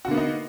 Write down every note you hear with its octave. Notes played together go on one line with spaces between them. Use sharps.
D3 A#3 B3 D#4 F#4